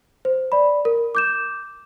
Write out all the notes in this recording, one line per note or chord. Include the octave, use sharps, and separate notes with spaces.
C5
D5 B5
A#4
D6 G6 E7